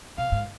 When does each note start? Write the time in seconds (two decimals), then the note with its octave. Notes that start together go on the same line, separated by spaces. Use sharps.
0.17 C3 F5
0.32 G#2